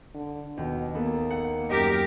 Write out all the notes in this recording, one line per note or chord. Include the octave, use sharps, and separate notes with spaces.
D3
D#2 B2
A#3 B3 A4
F#5
F#2 G4 A#4 D#5